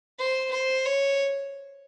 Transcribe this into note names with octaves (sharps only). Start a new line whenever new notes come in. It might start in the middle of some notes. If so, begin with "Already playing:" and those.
C5
C5
C#5